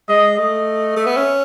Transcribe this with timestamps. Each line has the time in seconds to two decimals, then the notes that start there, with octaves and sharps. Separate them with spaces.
0.09 G#3 D#5
0.38 A3 D#5
0.97 A3 E5
1.07 B3
1.17 C#4